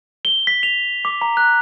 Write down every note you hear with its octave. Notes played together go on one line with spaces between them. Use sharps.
G7
B6
F7
D6
A#5
F#6